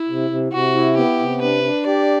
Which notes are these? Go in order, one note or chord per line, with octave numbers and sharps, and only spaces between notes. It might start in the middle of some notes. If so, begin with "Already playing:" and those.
Already playing: E4
C3
C3
C3 F#4
E4
B3 G4
C3
D4 B4
D4
G4 D5